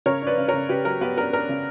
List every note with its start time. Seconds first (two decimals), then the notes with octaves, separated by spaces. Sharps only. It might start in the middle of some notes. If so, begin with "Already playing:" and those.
0.06 C#3 A#4 C#5
0.22 D4 B4 D5
0.38 C#3
0.48 A#4 C#5
0.53 C#3
0.69 C#3 G4 B4
0.85 F#3 A#4
1.01 B3 G4 B4
1.18 D4 A#4
1.33 D4 A#4
1.49 C#3